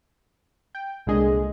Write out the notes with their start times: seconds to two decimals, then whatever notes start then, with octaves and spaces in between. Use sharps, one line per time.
0.75 G5
1.06 C2 A#2 D3 G#3 G#4 D#5